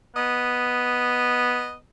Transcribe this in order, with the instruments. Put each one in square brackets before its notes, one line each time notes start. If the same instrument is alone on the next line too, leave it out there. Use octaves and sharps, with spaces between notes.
[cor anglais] B3 [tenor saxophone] D#5